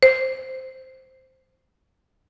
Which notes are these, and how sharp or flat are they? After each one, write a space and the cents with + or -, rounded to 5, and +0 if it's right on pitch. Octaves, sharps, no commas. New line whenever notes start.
C5 -5